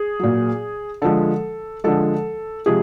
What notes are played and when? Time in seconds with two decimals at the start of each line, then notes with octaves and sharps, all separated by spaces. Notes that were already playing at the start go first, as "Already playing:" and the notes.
Already playing: G#4
0.19 A#2 F#3
1.02 D3 F3 G#3 A4
1.84 D3 F3 G#3 A4
2.66 C3 F3 G#3 G#4